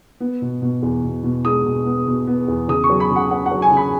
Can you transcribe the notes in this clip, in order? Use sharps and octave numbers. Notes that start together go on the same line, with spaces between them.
B3
B2
B2
E2
B2
B2
G#3 D#6
B2
B3
B2
B3
E2
C#3 D#6
C#6
F#3
B5
C#3
F#5
C#4 F#5
F#5
F#3
G#5
C#3
B5